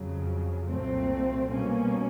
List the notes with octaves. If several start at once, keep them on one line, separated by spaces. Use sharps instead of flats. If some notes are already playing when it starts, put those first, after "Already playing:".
Already playing: F2 C#3 F#3
C2 A#2 F#3 A3 C4
B2 G3 A#3 C#4